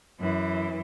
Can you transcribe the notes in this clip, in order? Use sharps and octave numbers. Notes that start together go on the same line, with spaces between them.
F#2 E3